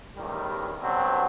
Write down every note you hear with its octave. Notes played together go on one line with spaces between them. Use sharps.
A1 E2 D#3 G3
B2 D3 F#3 G3 C4